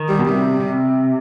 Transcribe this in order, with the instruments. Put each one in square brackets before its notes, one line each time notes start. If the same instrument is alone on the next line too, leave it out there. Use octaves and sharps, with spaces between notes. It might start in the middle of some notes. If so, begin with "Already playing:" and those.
Already playing: [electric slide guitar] D#3
[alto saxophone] G3
[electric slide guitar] B2
[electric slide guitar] C3 [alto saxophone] G3
[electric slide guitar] C3